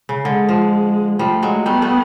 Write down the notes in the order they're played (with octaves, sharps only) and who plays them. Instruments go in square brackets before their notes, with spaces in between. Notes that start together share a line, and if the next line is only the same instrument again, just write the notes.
[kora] C#3
[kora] D3 [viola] G#3
[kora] F3
[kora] F3 G3 [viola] A3
[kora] F#3 G#3
[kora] G3 A3 [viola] B3
[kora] G3 A3